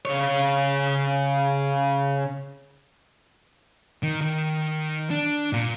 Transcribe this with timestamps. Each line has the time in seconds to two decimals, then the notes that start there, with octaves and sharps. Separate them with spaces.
0.05 C#3 C#5
4.03 D#3
4.22 D#3
5.10 D4
5.53 A#2